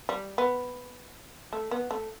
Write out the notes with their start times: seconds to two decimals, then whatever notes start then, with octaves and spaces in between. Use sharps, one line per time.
0.09 G3
0.38 B3
1.53 A3
1.71 B3
1.91 A3